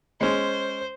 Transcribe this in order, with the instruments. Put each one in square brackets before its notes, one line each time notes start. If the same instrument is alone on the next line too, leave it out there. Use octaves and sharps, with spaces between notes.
[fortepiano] G#3 C#4 [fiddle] C5